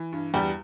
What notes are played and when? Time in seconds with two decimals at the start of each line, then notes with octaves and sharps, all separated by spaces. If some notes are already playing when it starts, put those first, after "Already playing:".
Already playing: E3
0.13 G2
0.34 E2 G3 G4